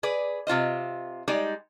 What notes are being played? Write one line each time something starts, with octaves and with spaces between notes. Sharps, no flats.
G#4 B4 D5
C3 F4 C5 D#5
G3 G#3 D#4 D5